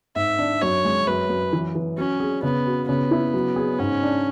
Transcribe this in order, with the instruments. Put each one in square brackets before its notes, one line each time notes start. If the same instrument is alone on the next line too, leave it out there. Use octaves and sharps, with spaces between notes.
[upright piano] G#2 [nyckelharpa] E5
[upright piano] D4
[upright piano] F#2 [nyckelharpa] C#5
[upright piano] G#3
[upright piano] F#2 [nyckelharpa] B4
[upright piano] F#2
E3
E3
[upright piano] F#3 [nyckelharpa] C#4
[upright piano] G#4
[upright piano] C#3 [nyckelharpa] B3
[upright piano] F#4
[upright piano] C#3 [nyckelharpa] B3
[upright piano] E4
F#3
G#4
[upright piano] G#2 [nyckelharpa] C#4
[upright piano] D4